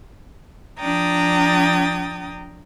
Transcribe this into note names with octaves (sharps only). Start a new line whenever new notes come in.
F3 D4 G5 A#5 D#6 A6